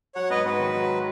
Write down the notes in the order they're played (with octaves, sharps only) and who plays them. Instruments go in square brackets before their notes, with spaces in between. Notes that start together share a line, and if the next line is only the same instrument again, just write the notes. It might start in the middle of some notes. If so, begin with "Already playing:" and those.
[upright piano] F#3 [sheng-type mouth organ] C#5 F#5
[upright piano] G#2 [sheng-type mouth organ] B4 D#5
[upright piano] G#2 [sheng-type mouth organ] F#4 B4
[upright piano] D#3
F#3